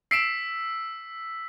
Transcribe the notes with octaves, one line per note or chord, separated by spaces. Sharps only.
E6 B6 C7 D7 E7